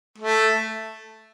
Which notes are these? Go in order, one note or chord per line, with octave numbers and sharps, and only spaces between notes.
A3